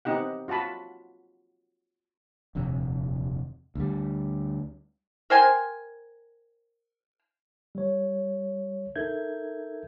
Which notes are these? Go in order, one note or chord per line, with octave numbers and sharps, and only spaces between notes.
B3 C4 D#4 G4 F#5
F4 F#4 F#5 A5 B5
D#1 F2 C3
D2 G3
A#4 C5 G5 G#5
G3 C#5
D#4 A4 A#4 E5 G6 G#6